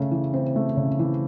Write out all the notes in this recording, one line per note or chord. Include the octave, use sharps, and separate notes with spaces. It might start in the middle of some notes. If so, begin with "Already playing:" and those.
Already playing: C#3 A3
E3
C4
A3
C#3
E3